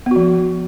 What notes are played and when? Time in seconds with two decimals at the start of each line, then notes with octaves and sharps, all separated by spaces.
0.06 B3
0.11 F#4
0.16 F3